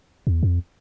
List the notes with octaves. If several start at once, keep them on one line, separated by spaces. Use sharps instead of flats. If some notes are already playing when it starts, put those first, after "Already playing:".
E2
F2